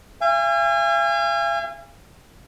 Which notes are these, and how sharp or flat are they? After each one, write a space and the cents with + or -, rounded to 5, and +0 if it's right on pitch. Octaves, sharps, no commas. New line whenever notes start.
F5 -45 G#5 -35